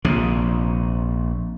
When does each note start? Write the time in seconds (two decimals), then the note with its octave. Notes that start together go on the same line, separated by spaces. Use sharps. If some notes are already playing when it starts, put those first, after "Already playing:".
0.05 A#1 C3